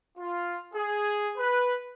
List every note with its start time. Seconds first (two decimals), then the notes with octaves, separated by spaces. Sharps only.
0.18 F4
0.74 G#4
1.38 B4